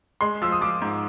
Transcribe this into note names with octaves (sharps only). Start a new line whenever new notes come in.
G#3 C6
F3 E6
D#6
F3 D6
G#2